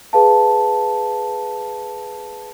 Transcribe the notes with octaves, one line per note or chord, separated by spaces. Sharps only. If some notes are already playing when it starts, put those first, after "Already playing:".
G#4 B4 F5 A5